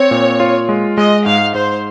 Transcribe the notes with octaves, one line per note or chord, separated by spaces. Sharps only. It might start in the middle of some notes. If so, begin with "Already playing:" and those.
Already playing: C4 C#5
A#2
F4
G#3
G#3 D#5
G#2 F5
G#2 C5